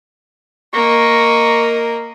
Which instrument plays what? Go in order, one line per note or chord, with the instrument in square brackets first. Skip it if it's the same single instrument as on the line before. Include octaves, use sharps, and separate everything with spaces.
[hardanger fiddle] A#3 D#5 [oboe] C#6